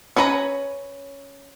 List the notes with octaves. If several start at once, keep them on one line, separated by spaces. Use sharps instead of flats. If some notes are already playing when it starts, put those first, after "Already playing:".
C#4 D4 B4 C#5 A#5